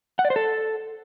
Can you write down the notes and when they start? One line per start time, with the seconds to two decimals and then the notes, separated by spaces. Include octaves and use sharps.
0.19 F#5
0.25 D5
0.30 C5
0.36 A4